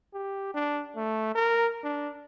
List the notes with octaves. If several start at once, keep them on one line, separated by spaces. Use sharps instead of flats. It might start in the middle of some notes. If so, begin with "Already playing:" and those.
G4
D4
A3
A#4
D4